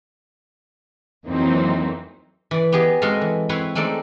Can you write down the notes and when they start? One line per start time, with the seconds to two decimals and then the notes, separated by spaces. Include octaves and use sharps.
1.26 F2 E3 F#3 A#3 C4 D#4
2.51 E3 D5
2.72 B3 G4 G#4 D#5
3.02 G#3 C4 F#4 A4 D#5 F5
3.21 E3
3.49 C4 E4 B4 C#5 C6
3.75 G#3 A3 C4 D#4 D5